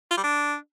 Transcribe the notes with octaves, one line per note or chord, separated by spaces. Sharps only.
F4
G3
D4